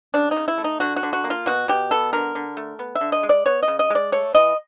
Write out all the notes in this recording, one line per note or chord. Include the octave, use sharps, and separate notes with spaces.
C#3 D4
D#4
C#3
E4
A3
D#4
D3 F#4
F#4
D3
F#4
A#3
F4
B2 F#4
B2 G4
B3 A4
D3 A#4
D3
A3
B3
E5
D3
D#5
G#3
D5
B3 C#5
D#5
C#3
D#5
G#3 D5
A3 C#5
E3 D#5